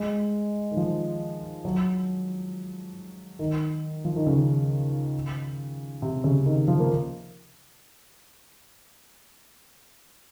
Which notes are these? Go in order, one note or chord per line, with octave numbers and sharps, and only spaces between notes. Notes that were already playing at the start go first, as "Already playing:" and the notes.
Already playing: G#3
D#3
F3
F#3
D#3
F3
D#3
C#3
C3
C#3
D#3
F3
A#3